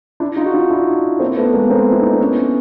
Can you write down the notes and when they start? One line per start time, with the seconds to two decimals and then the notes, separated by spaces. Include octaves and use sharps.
0.20 D4 E4
0.36 D#4 F4
0.46 F#4
0.54 D#4 F4
0.70 D4 E4
1.20 A#3 C4
1.37 A3 B3
1.54 G#3 A#3
1.70 A#3 C4
1.92 E4
2.02 D#4
2.12 D4
2.20 B3 C#4